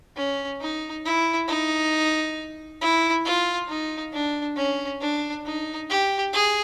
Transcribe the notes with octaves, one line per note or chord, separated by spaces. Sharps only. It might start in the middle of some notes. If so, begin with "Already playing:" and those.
C#4
D#4
E4
D#4
E4
F4
D#4
D4
C#4
D4
D#4
G4
G#4